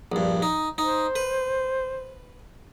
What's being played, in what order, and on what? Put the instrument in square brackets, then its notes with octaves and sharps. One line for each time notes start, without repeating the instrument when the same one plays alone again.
[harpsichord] A#1 G2
D#4
[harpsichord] D#4 [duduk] C5
[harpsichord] B4